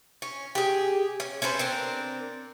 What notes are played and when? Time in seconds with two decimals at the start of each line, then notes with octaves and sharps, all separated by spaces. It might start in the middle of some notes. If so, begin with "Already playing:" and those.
0.22 C#4
0.55 G4 G#4
1.20 C#4
1.42 C#4 A4 B4 C5
1.59 C4 D4 A#4